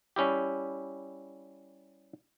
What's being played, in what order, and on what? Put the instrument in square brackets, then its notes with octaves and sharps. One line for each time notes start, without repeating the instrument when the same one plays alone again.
[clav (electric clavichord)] G3 C#4 E4 G4